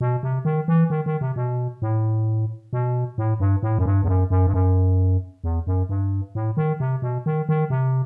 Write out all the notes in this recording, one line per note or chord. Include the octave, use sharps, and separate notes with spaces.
B2
C3
D#3
E3
D#3
D#3
C3
B2
A2
B2
A2
G2
A2
F#2
G2
E2
F#2
F#2
G2
F#2
E2
F#2
G2
A2
D#3
C3
B2
D#3
D#3
C3